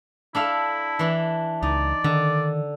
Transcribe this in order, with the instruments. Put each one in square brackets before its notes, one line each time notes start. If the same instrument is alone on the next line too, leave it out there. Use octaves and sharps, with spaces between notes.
[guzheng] D4 A4 F5 [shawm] E4
[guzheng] E3 D4
[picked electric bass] C#2 [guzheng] D#4 [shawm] D5
[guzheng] D3 [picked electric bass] D#3